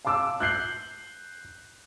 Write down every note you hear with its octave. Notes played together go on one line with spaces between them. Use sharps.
F5 A5 C6 D6 E6
F#6 G6 C7 F#7